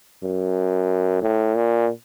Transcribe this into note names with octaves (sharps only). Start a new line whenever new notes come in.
F#2
A2
A#2